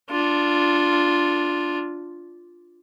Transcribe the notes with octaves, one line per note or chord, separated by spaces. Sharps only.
D4 F4